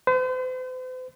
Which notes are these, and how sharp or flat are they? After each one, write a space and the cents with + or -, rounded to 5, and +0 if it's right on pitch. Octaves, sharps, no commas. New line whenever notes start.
C5 -45